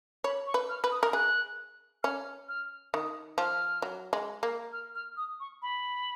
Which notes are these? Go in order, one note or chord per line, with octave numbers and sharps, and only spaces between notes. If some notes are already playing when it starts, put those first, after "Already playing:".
C#5 B5
C#6
B4
F6
B4
D#6
A#4
G#4 F#6
C#4 F6
F6
D#3 D#6
F3 F6
F#3
G#3
A#3
F6
F6
D#6
C#6
B5